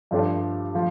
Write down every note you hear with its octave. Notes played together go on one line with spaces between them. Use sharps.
G2 F3 A3 D4 G4
F3